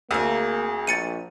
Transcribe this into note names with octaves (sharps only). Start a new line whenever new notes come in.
D2 A#3 C4 G#4
A#1 A6 C#7 D#7